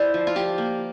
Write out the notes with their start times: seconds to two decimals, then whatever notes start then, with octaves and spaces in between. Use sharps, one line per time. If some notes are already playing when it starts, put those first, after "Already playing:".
Already playing: E4 C5 D5
0.14 F3
0.27 F4
0.36 F3 G4
0.58 A#3